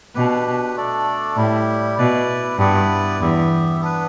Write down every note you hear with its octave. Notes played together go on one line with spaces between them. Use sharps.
B2 D4 G4 B4
A3 D4 A4 D5
A2 G3 E4 G4
B2 E4 B4 D5
G2 B3 E4 B4 D5
E2 B3 G4 E5
B3 D4 B4